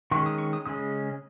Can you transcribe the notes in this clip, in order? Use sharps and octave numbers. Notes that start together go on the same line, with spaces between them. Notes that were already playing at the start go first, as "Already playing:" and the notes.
D#3 G#3 C#4 C#6
D#6
C#6
D#6
C#3 G#3 C#4 D#6